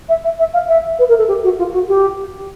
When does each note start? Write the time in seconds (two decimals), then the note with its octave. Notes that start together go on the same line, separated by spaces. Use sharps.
0.09 E5
0.24 E5
0.39 E5
0.53 F5
0.68 E5
0.99 B4
1.08 A#4
1.18 A4
1.28 G4
1.44 F#4
1.58 F4
1.72 F#4
1.88 G4